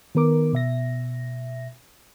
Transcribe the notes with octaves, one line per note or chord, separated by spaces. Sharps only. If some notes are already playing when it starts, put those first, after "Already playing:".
D#3 B3 A#4 D6
B2 E5 A#6